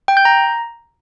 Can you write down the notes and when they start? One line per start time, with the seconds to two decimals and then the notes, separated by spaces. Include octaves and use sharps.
0.08 G5
0.17 G6
0.25 A#5